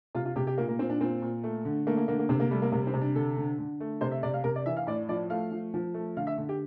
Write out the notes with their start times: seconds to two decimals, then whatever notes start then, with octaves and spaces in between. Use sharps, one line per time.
0.15 C3 F4
0.25 F4
0.36 C3 G4
0.47 G4
0.58 A#2 A#3
0.68 A#3
0.79 A#2 C4
0.90 D4
1.01 A#2 C4
1.22 A#2
1.44 A3
1.65 D3
1.87 A3 A#3
1.97 A#3
2.08 D3 A#3
2.19 A#3
2.29 C3 C4
2.40 A#3
2.51 G3 A3
2.62 A#3
2.72 C3 A#3
2.87 C4
2.94 C3
3.01 D4
3.15 D3 A4
3.37 D3
3.58 D3
3.80 A3
4.01 C3 C5
4.11 E5
4.23 C3 D5
4.34 F5
4.44 C3 A#4
4.56 D5
4.66 E3 E5
4.77 F5
4.87 A2 D5
5.09 F3 D5
5.30 A3 F5
5.51 F3
5.74 F3
5.94 A3
6.17 D3 F5
6.27 E5
6.38 D3
6.49 G4